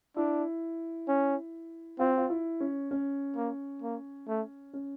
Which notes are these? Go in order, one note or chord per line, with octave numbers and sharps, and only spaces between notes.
D4 E4
C#4
C4 F4
F4
E4
C#4
C#4
A#3
A#3
A3
C#4